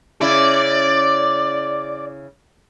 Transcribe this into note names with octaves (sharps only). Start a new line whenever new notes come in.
C#3 E4 D5